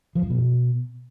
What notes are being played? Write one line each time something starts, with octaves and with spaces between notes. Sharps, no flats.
F3
F#2
B2